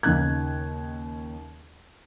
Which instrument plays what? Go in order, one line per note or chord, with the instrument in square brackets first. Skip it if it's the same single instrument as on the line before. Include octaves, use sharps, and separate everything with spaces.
[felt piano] D#2 C#3 D#4 F#6 G#6